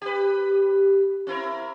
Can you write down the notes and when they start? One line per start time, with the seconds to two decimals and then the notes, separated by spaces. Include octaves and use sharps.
0.02 G4 B4
1.27 C4 E4 A#4